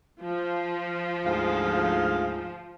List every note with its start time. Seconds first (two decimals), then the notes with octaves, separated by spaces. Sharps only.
0.22 F3
1.25 D2 G#2 F5